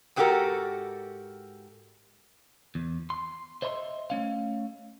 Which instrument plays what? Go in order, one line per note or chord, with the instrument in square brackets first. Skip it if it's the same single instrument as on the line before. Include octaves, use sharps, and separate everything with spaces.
[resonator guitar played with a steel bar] G#2 B3 F#4 G4 A4 A#4
[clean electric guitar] E2
C6
C5 D#5 E5 B5 C6
A3 C#4 F5